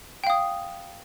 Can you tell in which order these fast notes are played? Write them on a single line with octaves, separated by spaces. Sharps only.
G5 F5 D#6